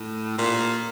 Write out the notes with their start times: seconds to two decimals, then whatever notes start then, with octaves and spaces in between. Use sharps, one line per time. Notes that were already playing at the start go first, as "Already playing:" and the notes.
Already playing: A2
0.38 A#2